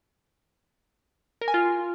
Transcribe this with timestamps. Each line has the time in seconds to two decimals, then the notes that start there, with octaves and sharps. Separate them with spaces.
1.41 A#4
1.48 G#5
1.54 F4